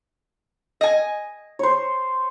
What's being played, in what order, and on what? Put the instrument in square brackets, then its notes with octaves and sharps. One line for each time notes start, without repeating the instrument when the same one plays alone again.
[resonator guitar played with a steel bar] D#5 G#5
[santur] C5 C#5